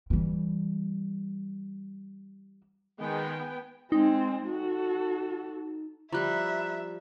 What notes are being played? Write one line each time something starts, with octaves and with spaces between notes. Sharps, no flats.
E3 G3
D#3 G#3 B3 G5 G#5
G#3 C4 D#4
F#4 A4
F3 G3 E5 A#5 B5 F#6